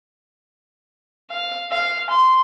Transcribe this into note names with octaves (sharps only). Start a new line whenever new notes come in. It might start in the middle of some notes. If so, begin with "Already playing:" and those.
F5
F5
C6